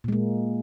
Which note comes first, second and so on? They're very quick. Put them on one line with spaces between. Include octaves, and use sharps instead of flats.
A#2 G#3 A#3